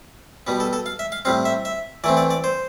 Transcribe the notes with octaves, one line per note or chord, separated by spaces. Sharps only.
B2 G3 B3
A4
A4
F5
E5
F5
A2 G3 C4 F5
E5
E5
E3 A3 C4 D5
D5
D5
C5